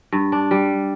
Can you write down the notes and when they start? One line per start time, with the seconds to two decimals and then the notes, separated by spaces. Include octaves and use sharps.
0.12 G2
0.32 D4
0.51 G3